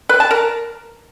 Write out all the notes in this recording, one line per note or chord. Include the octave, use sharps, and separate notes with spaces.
B4
A5
A#4